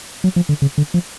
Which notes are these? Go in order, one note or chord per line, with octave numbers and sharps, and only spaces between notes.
F#3
F3
D3
C#3
D3
F3